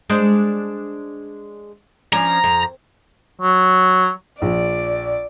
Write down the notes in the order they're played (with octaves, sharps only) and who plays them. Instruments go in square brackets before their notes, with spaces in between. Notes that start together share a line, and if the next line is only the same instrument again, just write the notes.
[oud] G#3 D4 C5
[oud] F3 C#4 D4 [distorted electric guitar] A#5
[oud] F2
[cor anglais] F#3
[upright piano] A#1 [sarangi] D5